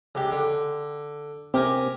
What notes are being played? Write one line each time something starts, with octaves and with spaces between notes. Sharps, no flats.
C#2 G4
D3
C3 G4 A#4 G#5